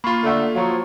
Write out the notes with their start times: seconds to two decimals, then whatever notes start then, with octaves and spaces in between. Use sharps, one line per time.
0.04 A#3 F4 B5 C#6 C7
0.23 D3 A3 A4 D5 F#5
0.56 F3 F#3 F5 A#5 C#6